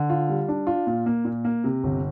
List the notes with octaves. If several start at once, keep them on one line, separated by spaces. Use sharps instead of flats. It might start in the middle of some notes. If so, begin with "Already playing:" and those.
Already playing: D3
F4
G3
D4
F4
A#2
A#3
A#2
A#3
C3
G1